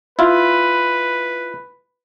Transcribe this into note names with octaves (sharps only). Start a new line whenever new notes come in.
E4 F4 B4